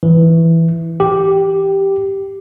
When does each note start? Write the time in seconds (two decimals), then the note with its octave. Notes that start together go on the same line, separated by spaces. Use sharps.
0.03 E3
1.00 G4